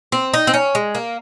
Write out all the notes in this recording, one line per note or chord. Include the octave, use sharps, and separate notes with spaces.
C4
D#4
C4
C#4
G#3
A#3